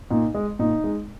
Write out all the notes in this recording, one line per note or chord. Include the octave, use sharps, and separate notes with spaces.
A#2 D#4
G#3
A#2 D#4
G#3